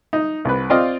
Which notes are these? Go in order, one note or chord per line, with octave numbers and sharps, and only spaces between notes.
D#4
C2 B4
C4 F4 D5 D#5 F5